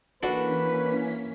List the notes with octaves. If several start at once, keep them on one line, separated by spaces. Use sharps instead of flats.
E3 A#3 C#4 D4 F#4 A4 B4 B6